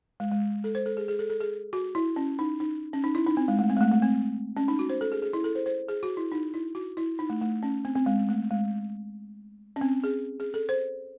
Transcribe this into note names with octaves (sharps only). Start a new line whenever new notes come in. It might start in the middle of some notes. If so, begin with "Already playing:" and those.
G#3
G#3
A4
C5
A4
G#4
G#4
A4
A4
G#4
F#4
E4
C#4
D#4
D#4
C#4
D#4
E4
D#4
C4
G#3
A3
C4
G#3
A3
A3
C4
C#4
D#4
F#4
C5
A4
G#4
G#4
E4
A4
C5
C5
G#4
F#4
E4
D#4
E4
F#4
E4
D#4
A3
A3
C#4
C4
C4
G#3
A3
G#3
C#4
C4
G#4
G#4
A4
C5